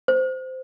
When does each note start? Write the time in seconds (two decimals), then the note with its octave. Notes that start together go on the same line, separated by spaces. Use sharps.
0.08 C5